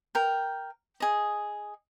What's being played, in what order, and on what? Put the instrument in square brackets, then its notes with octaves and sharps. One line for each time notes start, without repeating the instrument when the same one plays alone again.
[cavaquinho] A#4 G5
G#4 D#5